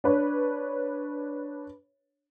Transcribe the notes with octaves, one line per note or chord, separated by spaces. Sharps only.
D4 B4 C#5